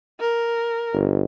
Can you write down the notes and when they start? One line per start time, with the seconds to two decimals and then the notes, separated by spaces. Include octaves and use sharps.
0.20 A#4
0.93 G1